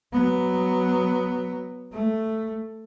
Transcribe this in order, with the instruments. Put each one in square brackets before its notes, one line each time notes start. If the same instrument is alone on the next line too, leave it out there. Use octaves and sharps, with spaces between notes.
[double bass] F#3 B3
A3